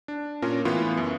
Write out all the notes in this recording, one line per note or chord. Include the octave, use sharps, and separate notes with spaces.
D4
A#2 C#4 F4 A#4
A2 E3 B3 E4 F4
F#2